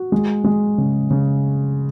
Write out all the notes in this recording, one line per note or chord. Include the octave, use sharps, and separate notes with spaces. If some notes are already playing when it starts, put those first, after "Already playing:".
Already playing: F#4
G#3
G#3
C#3
C#3